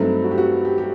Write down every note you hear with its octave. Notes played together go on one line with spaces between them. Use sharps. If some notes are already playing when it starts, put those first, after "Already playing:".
Already playing: G2 F#3 A3 C4 D#4 A4
F#4
G4
F#4
G4
G4